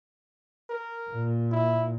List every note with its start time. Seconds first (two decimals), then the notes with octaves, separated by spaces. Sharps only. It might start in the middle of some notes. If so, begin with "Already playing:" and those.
0.70 A#4
1.11 A#2
1.51 E4